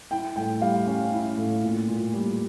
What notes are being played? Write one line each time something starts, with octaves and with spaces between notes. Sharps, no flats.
E4 G5
A2 G5
G3 F5
C#4
E4
A2
A#2
A#2
G3